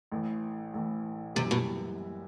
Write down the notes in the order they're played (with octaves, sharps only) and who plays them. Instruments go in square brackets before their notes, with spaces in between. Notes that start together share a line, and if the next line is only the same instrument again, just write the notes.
[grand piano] A1 A2 E3
A1 A2 E3
[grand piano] F#1 F#2 E3 G3 [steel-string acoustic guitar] C3
[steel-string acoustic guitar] B2